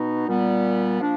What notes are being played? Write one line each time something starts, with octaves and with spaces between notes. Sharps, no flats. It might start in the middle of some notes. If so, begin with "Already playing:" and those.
Already playing: B2 B3 D#4
A#2 G3 B3
F3 A#3 D4